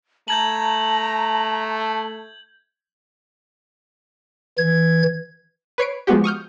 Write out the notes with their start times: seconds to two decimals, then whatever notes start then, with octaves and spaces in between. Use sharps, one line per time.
0.28 A3 A5 A#5 G6 G#6 F#7
4.58 E3 G#6
5.78 B4 C#5 C7 D7
6.07 F3 G#3 B3 F#4 G4
6.24 C#6 D#6 F6 G6